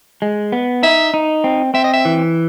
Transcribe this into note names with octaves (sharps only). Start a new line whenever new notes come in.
G#3
B3
D#4 E5
D#4
C4
C4 E5
D#5
E5
E3